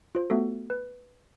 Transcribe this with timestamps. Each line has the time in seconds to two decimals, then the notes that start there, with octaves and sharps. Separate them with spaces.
0.15 F4 C5
0.30 A3 B3 F#4 A4
0.70 B4